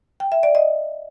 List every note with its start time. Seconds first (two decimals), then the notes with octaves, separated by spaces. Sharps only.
0.20 G5
0.32 E5
0.43 D5
0.55 D#5